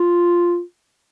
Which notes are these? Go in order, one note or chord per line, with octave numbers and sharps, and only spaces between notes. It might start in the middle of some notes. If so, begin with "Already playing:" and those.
Already playing: F4